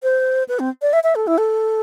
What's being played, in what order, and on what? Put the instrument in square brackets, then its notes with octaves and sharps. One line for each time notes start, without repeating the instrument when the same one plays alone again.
[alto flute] C5
B4
C4
D5
E5
E5
A4
E4
A4